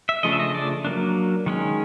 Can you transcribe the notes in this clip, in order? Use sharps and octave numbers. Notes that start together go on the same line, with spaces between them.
E5
C#3 F3 A3 D4 D#5
E5
D#5
D5
F#3 A#3 D4
D#3 G#3 C#4